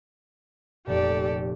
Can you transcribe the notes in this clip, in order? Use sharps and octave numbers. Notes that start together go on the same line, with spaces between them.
F1 A#2 G4 A4 D5